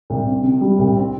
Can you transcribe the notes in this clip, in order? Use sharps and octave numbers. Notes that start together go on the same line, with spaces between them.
C2
C4
C3
G3
C2
C4